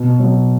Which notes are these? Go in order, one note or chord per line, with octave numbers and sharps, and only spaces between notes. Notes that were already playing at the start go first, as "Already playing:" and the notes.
Already playing: B2
F#3